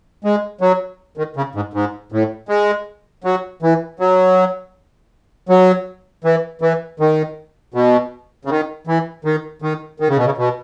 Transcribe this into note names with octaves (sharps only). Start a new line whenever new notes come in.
G#3
F#3
D#3
C#3
G#2
G#2
A2
G#3
F#3
E3
F#3
F#3
E3
E3
D#3
B2
C#3
D#3
E3
D#3
D#3
D#3
C#3
B2
C#3
B2